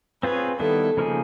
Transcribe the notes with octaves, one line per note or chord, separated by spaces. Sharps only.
C4 F4 G#4 B4 C#5
D#3 G3 B3 E4 A4
C#3 F3 A#3 D#4 G#4